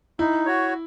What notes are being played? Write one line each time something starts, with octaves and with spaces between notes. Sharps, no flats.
D#4 E4
F#4 C#5